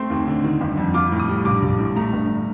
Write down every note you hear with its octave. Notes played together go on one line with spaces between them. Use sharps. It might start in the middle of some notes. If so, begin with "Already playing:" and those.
Already playing: A3 C4 C6
D#2
D3
D#3
G1
F2
F4 D6
A2
D#6
G3
A#1 D6
A#1
A2
A3 A#5
G1